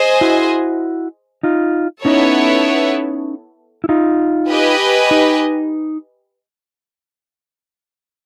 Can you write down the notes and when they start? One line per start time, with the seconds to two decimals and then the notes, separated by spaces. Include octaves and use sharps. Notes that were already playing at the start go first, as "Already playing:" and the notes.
Already playing: G#4 C5 D#5 G#5
0.21 E4 F#4
1.43 D#4 F4
2.05 B3 C#4 D#4 E4 A4 C#5
3.84 E4
3.89 D#4 F4
4.50 G4 B4 D#5 G#5
5.11 D#4